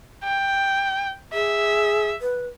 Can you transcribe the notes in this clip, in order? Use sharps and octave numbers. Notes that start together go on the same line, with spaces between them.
G5
G#4 E5
B4